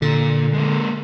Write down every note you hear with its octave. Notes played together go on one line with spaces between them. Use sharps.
A#2 D3
G#3 A#3